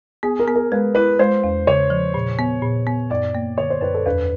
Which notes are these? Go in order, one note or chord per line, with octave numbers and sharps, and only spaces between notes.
B3 G#4
A#4
B3
A#4
G#3 B4
E4 B4
G#3 C5
E2
C#3 C#5
F3
A#2
B3
A#2
B3
F#2 D5
A#3
D3 C#5
C5
F#2 B4
A4
E2 B4